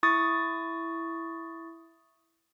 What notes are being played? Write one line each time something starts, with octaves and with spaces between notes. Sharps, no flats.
E4 C#6 D#6 A6